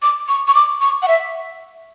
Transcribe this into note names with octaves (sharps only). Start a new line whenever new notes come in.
D6
C#6
C#6
D6
C#6
F#5
E5